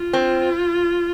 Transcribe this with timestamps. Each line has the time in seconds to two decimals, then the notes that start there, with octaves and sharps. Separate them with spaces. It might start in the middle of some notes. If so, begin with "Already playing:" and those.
Already playing: F4
0.13 C4